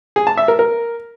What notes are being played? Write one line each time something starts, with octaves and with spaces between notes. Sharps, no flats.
G#4
A5
E5
A#4
A#4